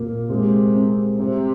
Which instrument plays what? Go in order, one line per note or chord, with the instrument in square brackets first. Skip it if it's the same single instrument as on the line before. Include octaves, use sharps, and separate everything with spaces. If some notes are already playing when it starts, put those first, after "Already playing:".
Already playing: [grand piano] A#2 A#3
[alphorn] C3 [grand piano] G#3
[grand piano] C4
[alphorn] C3 [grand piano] G3